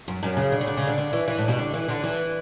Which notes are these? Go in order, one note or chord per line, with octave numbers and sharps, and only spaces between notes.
F#2
F#2
C#3
D3
C#3
D3
C#3
D3
D3
E3
E3
A2
B2
D3
E3
D3
E3